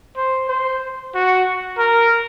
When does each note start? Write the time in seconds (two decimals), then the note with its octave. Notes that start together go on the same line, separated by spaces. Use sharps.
0.17 C5
0.49 C5
1.15 F#4
1.78 A#4